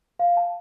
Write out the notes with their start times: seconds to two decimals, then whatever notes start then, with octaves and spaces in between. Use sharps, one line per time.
0.19 F5
0.37 A5